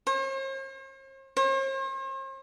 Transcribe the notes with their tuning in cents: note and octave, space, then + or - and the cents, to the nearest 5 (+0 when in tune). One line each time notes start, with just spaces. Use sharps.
C5 +45
C5 +45